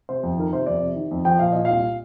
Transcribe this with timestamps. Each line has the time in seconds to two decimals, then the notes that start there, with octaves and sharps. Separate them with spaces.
0.09 C3 C5
0.23 F2
0.38 D#3 A#4
0.53 C3 C5
0.66 F2 D5
0.81 C3
0.96 D#3
1.11 F2
1.25 F3 G5
1.39 A#2 F5
1.52 A#2 D#5
1.65 C2 F5